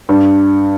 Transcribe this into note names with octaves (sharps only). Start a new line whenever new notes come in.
G2